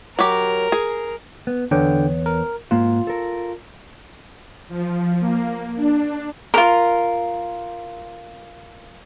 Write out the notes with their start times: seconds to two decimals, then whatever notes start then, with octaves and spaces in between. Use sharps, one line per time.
0.19 F#3 G4 A#4
0.72 G#4
1.47 B3
1.71 E2 D3 B3 C#5 G5
2.26 A#4
2.71 G#2 A#3 F4 F#4
3.07 A4 A#4
4.68 F3
5.20 A#3
5.76 D4
6.54 F4 A#4